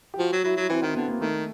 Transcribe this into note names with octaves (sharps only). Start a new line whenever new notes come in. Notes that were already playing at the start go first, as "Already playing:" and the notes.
G4
F3 F#4
F#3
F#3 E4
F#3
E3 C4
D#3 C4
D3 B3
A#3
D#3 A3